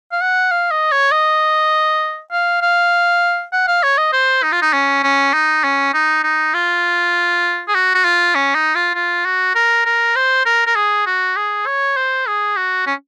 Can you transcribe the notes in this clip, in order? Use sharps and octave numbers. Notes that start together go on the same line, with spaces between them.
F5
F#5
F5
D#5
C#5
D#5
F5
F5
F#5
F5
C#5
D#5
C5
D#4
F4
D#4
C#4
C#4
D#4
C#4
D#4
D#4
F4
G#4
F#4
F#4
F4
C#4
D#4
F4
F4
F#4
A#4
A#4
C5
A#4
A#4
G#4
F#4
G#4
C#5
C5
G#4
F#4
C#4